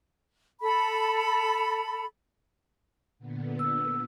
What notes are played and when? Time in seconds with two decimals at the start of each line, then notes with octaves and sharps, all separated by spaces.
0.61 A4 B5
3.18 A#2 D3 B3
3.59 E6